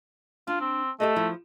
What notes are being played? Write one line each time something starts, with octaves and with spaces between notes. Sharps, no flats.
D4 F4
C4
A3 G4 A4 D#5
F3 E4